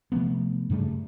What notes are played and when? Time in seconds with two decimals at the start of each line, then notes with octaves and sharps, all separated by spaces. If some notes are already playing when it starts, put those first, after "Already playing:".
0.12 C3 F3 A3 B3
0.70 G2 C#3 G3 A3